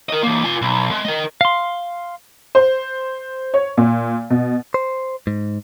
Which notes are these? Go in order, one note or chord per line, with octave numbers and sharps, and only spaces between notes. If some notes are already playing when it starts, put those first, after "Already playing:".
A#4 D#5
E3 A#3
F4 G#5
B1
G#3
A#4 D#5
F5 C6
C5
C#5
A#2
B2
C5
G#2